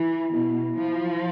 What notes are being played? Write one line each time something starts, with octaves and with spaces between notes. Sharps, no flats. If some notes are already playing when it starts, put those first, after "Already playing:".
Already playing: E3 E4
B2 E4
F3 E4